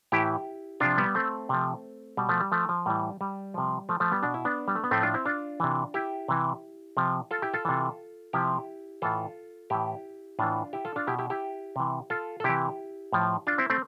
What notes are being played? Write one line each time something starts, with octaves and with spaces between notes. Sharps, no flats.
A2 E3 E4 G4
C3 F3 D4 F4
G3 B3
A3 C4
C3 F3
B2 G3
F3 A3
G3
F3 A3
F3
A2 E3 G3
G3
C3 F3
F3 A3
F3 A3
G3 B3
B2 D4
E4
B3 D4
G3
A3
B3
A2 F3 A3 C4
D4 F4
C4 E4
D4 F4
C3 E3
E4 G4
C3 E3
C3 F3
F4 A4
E4 G4
F4 A4
C3 E3
C3 F3 E4 G4
A2 E3 F4 A4
A2 E3 E4 G4
A2 E3 D4 F4
E4 G4
F4 A4
D4 F4
B2 E4 G4
E4 G4
E4 G4
C3 E3
F4 A4
A4
C3 E3 E4 G4
A2 F3
D4 F4
C4 E4
A3 C4